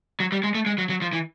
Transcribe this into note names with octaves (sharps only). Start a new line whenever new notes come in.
F#3
G3
G#3
A3
G#3
F#3
F#3
F3
E3